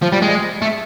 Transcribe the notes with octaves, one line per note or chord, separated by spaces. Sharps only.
F3
G3
G#3
A3